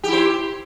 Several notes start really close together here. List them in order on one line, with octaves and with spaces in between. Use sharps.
G4 E4 C5